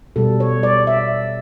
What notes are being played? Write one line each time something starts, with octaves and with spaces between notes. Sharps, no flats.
B2 G3 A4
C#5
D5
E5